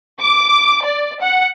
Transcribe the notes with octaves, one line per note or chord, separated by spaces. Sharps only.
D6
D5
F#5